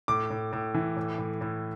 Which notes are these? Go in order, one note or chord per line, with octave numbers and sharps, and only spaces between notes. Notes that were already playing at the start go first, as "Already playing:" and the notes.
A2 D6
A2
A2
E3
A2
A2
A2